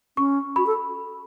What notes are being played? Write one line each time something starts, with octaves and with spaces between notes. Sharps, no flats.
C#4 C#6
F#4 B5
A4